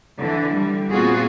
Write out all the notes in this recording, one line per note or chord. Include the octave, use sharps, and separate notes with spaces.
D3 E3
G3
A#2 B3 C4 F4 F#4 G#4